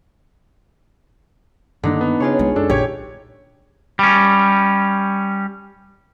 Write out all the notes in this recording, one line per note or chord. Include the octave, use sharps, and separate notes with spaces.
G2 D3 D#3 A#3 D4 D#4
B3
C#3 F4 G#4 C#5
C2 G#3
F#2 D4 A4
A#1 G4 C#5 G#6
G3 C#4